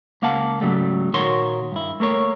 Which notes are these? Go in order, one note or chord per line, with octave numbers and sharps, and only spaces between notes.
C#2 A#3 F5 F#5 A5
G#2 C#3 F#3 G3 A3
A#2 D#3 F#4 A#4 C#5 C6
G2 E4
A3 A#3 A#4 C#5